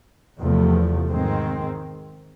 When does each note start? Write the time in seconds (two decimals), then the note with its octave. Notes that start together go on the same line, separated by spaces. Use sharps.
0.38 E2 C3 F3 A3
1.08 G#2 D#3 G#3 C4